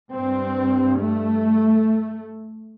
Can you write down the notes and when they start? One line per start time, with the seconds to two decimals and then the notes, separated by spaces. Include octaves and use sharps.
0.13 G2 C4
1.00 A3